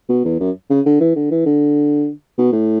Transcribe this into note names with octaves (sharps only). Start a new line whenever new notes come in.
B2
E2
F#2
C#3
D3
E3
D3
E3
D3
B2
A2